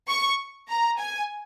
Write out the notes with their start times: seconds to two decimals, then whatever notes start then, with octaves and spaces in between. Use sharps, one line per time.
0.09 C#6
0.70 A#5
0.99 G#5